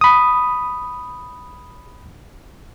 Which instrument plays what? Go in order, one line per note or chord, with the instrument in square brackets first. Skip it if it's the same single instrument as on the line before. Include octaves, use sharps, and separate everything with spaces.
[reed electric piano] B5 D#6